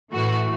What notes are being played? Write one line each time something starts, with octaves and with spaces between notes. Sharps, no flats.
A2 E3 A3 F#4